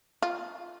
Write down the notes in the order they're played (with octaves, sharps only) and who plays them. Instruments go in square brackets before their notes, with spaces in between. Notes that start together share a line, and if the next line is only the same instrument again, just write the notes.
[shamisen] F4